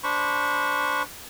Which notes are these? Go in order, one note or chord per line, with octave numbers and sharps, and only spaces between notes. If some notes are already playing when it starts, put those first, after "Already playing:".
D4 C5 B5 C#6